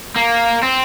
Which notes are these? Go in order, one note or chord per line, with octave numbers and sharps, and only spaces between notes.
A#3
C4